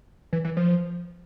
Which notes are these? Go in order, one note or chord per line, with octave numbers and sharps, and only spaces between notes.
E3
E3
F3